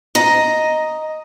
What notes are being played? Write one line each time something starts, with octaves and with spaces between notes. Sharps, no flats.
D#5 A#5